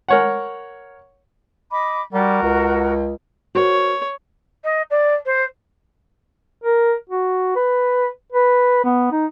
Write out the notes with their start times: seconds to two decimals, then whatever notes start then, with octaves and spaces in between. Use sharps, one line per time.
0.09 A#4 C#5 F#5
1.70 D#5 B5 D6
2.13 G3 F#4 A#4 F#5
2.42 C#2
3.55 F#4 A#4 C5 C#5
4.64 D#5
4.90 D5
5.25 C5
6.63 A#4
7.10 F#4
7.56 B4
8.32 B4
8.85 B3
9.12 D#4